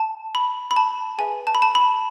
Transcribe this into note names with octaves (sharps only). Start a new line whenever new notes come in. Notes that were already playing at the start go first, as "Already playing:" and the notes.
Already playing: A5
B5
B5
A5
G#4 B4 E5 G#5
A5
B5
A5
B5